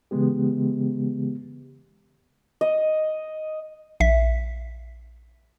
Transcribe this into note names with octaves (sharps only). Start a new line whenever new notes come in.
C#3 E3 G#3 B3 G4
D#5
A#1 E5 B6